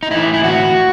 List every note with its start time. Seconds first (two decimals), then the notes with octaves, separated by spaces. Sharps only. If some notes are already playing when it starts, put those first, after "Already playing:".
0.03 D#4
0.11 A2 E3 E4
0.34 E4
0.44 F#4